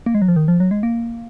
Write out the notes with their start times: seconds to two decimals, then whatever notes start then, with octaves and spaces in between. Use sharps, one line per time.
0.06 A#3
0.15 G#3
0.22 F#3
0.28 F3
0.36 D#3
0.48 F3
0.60 F#3
0.71 G#3
0.83 A#3